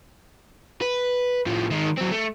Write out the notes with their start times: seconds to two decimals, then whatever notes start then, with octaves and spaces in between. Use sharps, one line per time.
0.81 B4
1.46 A2 F3
1.71 D#3 G#3
1.98 F#3 C4
2.12 A3